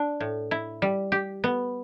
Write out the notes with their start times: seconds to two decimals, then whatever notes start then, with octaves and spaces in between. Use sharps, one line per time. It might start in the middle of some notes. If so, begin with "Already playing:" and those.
Already playing: D4
0.20 A2
0.51 E4
0.82 G3
1.12 G4
1.44 B3